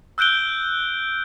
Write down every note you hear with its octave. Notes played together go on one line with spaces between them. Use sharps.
E6 F#6 G6 D7 G7